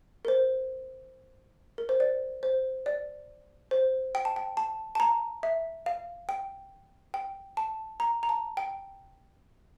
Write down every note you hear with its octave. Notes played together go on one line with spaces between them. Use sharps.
A#4
C5
A#4
C5
D5
C5
D5
C5
G5
A5
G5
A5
A5
A#5
E5
F5
G5
G5
A5
A#5
A#5
A5
G5